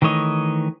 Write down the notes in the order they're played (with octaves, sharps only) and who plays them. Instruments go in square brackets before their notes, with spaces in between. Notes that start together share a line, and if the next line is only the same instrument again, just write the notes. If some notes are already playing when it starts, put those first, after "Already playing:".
[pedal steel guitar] D#3 E3 A3 C#5 D#5